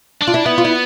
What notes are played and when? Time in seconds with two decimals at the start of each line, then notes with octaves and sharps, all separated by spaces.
0.22 D4
0.27 F4
0.34 E4
0.46 B3 E4
0.58 F4
0.65 E4